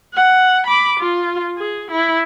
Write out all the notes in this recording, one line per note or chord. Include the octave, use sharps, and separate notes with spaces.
F#5
B5 D6
F4
G#4
E4